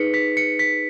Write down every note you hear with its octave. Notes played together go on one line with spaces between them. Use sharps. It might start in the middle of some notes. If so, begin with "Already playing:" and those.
Already playing: D#4 G#4 B4 B6 C#7
B6
C#7
B6